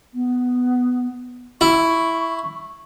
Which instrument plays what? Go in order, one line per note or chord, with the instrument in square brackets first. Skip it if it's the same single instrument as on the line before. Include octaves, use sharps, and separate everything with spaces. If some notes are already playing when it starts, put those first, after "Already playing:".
[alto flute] B3
[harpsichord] E4 [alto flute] C#6